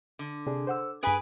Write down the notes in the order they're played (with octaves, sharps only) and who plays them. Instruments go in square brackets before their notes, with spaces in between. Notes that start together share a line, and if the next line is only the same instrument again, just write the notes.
[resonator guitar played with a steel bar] D3
[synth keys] C3 D4 G#4
C5 F#5 E6
[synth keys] G2 B5 D7 [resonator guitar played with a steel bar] G#4 B4 G#5